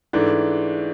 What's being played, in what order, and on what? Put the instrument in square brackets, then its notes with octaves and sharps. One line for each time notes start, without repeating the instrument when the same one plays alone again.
[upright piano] G#2 E3 A3 D4